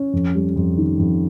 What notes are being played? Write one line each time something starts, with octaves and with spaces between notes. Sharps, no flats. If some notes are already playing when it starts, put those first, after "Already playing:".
Already playing: C#4
F2
G3
F2
D#3
F2